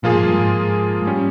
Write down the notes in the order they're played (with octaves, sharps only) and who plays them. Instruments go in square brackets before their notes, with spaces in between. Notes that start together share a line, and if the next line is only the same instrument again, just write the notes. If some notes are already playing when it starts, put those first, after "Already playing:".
[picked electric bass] A#2 [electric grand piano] F3 A#3 F4 G#4
[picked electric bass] G#2
G2
G#2
G#2
[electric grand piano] G3 C#4